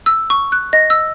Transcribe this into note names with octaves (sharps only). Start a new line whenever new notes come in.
E6
C#6
F#6
D#5
E6